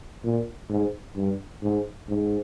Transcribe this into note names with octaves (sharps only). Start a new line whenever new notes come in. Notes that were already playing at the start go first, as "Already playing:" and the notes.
A#2
G#2
G2
G#2
G#2